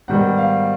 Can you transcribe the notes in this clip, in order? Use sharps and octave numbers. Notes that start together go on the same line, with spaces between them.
G#2 D#3 G3 B3 F#5
F5